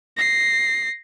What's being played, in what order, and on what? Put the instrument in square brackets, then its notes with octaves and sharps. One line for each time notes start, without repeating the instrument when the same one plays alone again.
[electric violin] A#6 C7